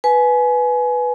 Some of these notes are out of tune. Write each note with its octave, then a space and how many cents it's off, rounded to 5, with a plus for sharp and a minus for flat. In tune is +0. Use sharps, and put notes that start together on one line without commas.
B4 +0 G#5 +25